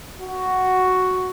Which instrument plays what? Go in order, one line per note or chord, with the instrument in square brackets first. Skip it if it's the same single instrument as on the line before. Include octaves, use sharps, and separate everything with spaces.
[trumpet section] F#4